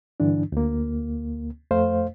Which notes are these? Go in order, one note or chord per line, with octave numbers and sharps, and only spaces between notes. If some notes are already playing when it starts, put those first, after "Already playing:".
G2 D3 E3 D4
D2 A#3
F2 A3 C5 F5